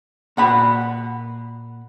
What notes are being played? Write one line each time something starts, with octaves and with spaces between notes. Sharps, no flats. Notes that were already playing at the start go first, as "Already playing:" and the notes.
A#2 F#5 B5